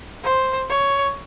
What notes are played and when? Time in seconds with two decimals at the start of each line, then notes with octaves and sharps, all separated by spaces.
0.24 C5
0.69 C#5